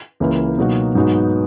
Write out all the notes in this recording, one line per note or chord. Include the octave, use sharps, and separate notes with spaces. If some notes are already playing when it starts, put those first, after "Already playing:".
C#2 C#3 E3 A#3 E4
B2 F#3 A#3 D#4 F#4
G#2 F#3 B3 D#4 F#4